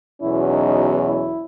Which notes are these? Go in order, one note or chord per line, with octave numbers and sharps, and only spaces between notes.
E2 B2 F#3 C#4 E4
D#4
E4